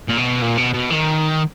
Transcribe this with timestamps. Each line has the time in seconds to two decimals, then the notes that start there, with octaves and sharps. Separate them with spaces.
0.08 A#2
0.17 B2
0.42 A#2
0.57 B2
0.74 B2
0.90 D#3